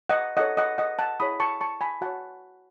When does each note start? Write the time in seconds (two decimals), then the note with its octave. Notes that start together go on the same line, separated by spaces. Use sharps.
0.09 D#5 F#5
0.37 D#4 A4 C#5 D#5 F#5
0.57 D#5 F#5
0.78 D#5 F#5
0.99 F#5 A5
1.20 E4 G#4 C#5 B5 D#6
1.40 A5 C#6
1.61 A5 C#6
1.81 G#5 B5
2.01 F#4 F#5 A5
2.06 C#5